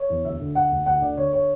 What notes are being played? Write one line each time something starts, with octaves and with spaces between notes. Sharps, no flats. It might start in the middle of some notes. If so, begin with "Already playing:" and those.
Already playing: C#5
E2
D2 E5
D3
D3 F#5
D2
D2 F#5
D3 D5
D3 C#5
C#5